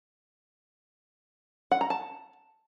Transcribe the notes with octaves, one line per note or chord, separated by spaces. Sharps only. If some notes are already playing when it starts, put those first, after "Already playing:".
F#5
A#5
A5